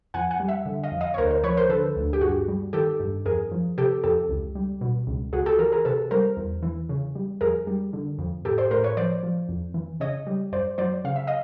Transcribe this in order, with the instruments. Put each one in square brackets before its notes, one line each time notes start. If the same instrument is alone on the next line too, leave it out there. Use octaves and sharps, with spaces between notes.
[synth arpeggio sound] F2 F#5 G#5
F#5 G#5
G3
E5 F#5
D3
D#5 F5
F2
D#5 F5
C#5
D2 A#4 C5
A#4 C5
F3 B4 C#5
A#4 C5
D3 A4 B4
D2
G4
G2 F#4 G#4
G3
D#3 G4 A4
G2
F2 G#4 A#4
F3
C3 G4 A4
F2 G4 A4
C#2
G3
B2
C#2
C#2 F#4 G#4
G4 A4
E3 G#4 A#4
G#4 A#4
C3 A4 B4
G3 A#4 C5
E2
E3
C#3
G3
F2 G#4 A#4
G3
D3
F2
A2 G4 A4
C5 D5
A2 A#4 C5
B4 C#5
F3 C5 D5
F3
F2
E3
C#3 C#5 D#5
G3
F#2 C5 D5
F#3 C5 D5
C#3 F5
E5
D#5 F5